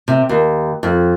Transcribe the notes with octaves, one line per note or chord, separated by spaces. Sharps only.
C3
D#2
F2